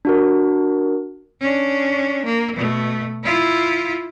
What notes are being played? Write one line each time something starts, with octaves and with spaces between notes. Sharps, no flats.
D4 F#4 A#4
C#4 D4
A#3
B2 A3
E4 F4